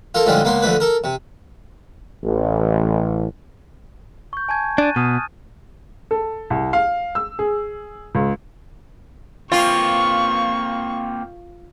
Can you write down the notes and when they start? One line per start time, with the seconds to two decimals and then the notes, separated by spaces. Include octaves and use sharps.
0.15 F4 A4 A#4
0.26 A2 D3 F3 G3 G#3 F4
0.44 C#2 A#3 B3 C6
0.62 D3 F3 A3 B4
0.80 A4 A#4
1.04 C3
2.24 A1
4.33 C#6 G6
4.49 G#5 A5 G#6
4.78 D4 F#6 A6 D#7
4.96 B2 D#6 F6 D#7
6.11 A4
6.50 C2
6.73 F5
7.15 E6
7.39 G#4
8.15 C#2
9.52 A#3 C4 F4 C#6